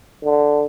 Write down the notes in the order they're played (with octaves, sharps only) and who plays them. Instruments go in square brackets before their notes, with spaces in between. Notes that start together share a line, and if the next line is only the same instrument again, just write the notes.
[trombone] D3